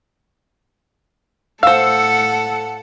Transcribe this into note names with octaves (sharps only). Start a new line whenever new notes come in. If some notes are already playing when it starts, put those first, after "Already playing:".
A2 A4 C5 F5 F#5 E6